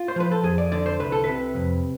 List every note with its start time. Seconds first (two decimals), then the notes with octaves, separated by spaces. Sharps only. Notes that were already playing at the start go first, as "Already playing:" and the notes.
Already playing: F4
0.08 C5
0.16 F3 B4
0.31 A4
0.43 F2 G#4
0.58 D5
0.72 D3 D5
0.86 C5
1.00 C2 B4
1.12 A4
1.24 C3 B4
1.56 F2